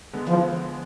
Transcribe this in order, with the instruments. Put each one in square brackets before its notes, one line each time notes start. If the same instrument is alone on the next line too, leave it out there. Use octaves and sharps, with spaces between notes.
[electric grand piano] D3 G#3 B3
[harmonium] F3